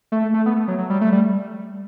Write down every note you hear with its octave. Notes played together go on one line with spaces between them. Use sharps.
A3
A3
B3
A3
F#3
F#3
G3
A3
G3